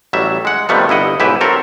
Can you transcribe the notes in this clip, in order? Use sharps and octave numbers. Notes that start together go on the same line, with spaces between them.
A1 F#3 G3 E5
G#3 F#5
C3 D#3 F3 G3 A3 B3
G1 E4 D#5 F#5
B1 G#2 E4 G4 B4 E5
F#3 C4 A4 A#4